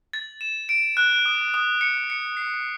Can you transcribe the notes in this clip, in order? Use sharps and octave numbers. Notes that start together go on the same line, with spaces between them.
A6
E7
D7
F#6
D#6
D#6
C#7
C#7
C7